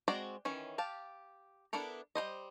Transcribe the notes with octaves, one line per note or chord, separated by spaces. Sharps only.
G#3 C4 F#4 D5 A#5
D#3 E3 C#4
G4 F5 A5
B3 D4 E4 A4 A#4
G3 B4 C5 D#5